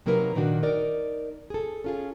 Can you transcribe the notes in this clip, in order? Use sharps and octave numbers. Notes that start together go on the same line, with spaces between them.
C3 F#3 A#3 D#4 A#4 B4
A#2 D#3 D4 F#4
D#4 A#4 D5
G#4 A4
C#4 F4 G#4